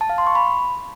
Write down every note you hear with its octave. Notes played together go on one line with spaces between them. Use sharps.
A5
F5
C6
C#6
B5